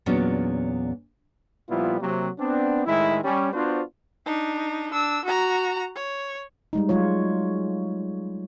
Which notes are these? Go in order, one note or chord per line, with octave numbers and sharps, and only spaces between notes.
E2 A#2 F#3 B3 C#4 D4
A#2 F3 G3 B3 E4 F4
C3 F#3 A#3
B3 C4 D4
A2 D#3 G#3 E4
G3 C#4
B3 D4 F4 F#4 C5
D4 D#4
D4 E6
F#4 A#5
C#5
G3 G#3 D#4
F#3 G#3 F4 C#5